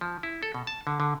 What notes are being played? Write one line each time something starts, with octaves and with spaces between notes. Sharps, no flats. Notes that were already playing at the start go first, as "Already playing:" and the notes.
F3
E4
A4
B2
A5
D3
D3